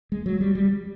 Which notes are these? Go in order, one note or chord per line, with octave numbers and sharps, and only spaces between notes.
G#3
F#3
G3
G3